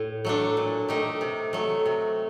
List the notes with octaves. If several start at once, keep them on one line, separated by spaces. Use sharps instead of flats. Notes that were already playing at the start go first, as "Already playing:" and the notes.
Already playing: A2
F#3 A3 D4
A#2
A3 D#4 G4
C3
F#3 A3
C3